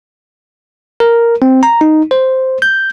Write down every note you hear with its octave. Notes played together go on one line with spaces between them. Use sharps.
A#4
C4
A#5
D#4
C5
G6